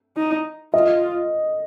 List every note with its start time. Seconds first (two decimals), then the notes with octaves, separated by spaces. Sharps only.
0.17 D#4
0.74 F4 D#5